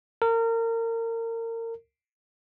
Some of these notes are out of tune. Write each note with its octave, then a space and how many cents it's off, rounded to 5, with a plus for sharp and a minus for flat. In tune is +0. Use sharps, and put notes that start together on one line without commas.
A#4 -30